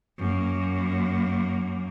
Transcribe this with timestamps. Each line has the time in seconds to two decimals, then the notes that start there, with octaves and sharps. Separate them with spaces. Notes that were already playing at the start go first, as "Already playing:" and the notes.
0.18 F#2 A#3